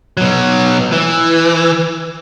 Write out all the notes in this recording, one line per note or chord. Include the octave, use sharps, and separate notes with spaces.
B2 F#3
E3